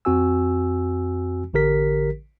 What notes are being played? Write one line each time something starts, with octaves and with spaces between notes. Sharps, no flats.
F2 C4 F#4 G#5 E6
A1 D3 G4 A#4 B6